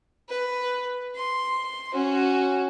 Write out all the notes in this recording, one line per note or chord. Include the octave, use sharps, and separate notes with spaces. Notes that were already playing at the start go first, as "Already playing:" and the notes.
B4
C6
C#4 F#4